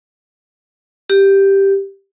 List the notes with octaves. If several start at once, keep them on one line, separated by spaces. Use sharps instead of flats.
G4